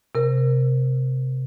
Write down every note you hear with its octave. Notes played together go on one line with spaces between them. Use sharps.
C3 A#4